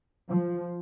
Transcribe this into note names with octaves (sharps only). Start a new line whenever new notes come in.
F3